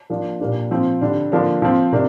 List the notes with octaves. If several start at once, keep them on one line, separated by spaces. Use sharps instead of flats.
F3 A#3 D4
A#2 G3 A#3 D4
F3 C4
D3 G3 D4
D3 F3 A#3 D4
F3 C4
C3 A#3 D4